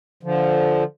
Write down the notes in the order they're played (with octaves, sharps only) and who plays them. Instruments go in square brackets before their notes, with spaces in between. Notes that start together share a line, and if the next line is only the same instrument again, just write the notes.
[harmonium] D3 F3